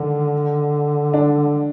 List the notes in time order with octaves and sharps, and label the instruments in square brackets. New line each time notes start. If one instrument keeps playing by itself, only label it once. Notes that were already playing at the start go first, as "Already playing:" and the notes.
Already playing: [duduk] D3 [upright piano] D#3
[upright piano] D4